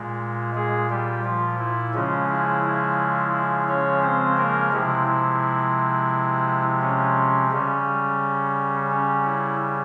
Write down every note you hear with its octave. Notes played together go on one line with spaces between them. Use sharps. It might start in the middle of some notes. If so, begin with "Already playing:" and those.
Already playing: A#2 G#3
G#3 G#4
G3 G4
F3 F4
E4
C#3 F3 G#3 C#4
E4
E4
E4
C#4 C#5
C4 C5
A#3 A#4
C3 F3 G#3 E4
E4
C#4
C#3 G3 C#4
C#4
E4